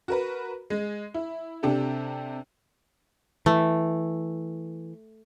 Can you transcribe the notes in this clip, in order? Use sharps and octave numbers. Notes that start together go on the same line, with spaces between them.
F#4 A#4 B4
G#3
E4
C3 D4 G4 A4
E3 A3